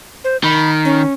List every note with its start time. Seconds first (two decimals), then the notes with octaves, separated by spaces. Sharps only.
0.24 C5
0.44 D#3 B5
0.85 C#4